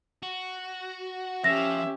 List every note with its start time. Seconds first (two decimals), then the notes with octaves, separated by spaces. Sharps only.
0.23 F#4
1.44 F3 C#4 G4 E5 A#6